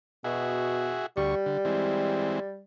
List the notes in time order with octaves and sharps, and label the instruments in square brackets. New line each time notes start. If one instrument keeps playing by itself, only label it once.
[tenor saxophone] B2 [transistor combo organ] F#4 G#4 E5
[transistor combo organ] D2 C#6 [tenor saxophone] G3
[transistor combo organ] D3
E3 G#3 C4